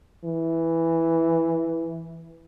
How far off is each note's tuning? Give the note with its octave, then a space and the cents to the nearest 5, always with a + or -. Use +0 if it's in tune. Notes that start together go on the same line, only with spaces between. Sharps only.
E3 +0